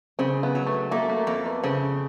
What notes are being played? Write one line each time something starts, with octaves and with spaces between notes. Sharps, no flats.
C#3 C4
B3
F#3
A3
A3 A#3
A#3
F2 A#3
B3
C#3 C4